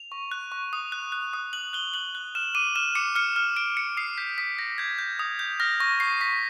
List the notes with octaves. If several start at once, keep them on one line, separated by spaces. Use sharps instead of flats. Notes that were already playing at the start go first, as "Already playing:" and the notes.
Already playing: F7
C#6
F#6
C#6
D#6
F#6
F#6
D#6
F#6 F#7
F#6 G7
F#6 F#7
F#6
F6 E7
D6 D#7
F6 E7
D6 C#7
F6 C#7
F6
F6 D7
F6 C#7
D#6 C7
G6 B6
D#6 B6
G6 A#6
G6 G#6
G6
D#6
G6
F6 A#6
C#6 A#6
C#6 C7
C#6 B6